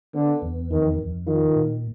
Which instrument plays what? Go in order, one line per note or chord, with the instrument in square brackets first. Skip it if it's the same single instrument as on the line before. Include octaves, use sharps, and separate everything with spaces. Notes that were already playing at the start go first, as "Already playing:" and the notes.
[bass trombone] D3 [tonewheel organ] B3
[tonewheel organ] E2
[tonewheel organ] F2 [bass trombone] D#3
[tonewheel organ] F2
[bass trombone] D#3 [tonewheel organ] F4
[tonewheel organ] A#2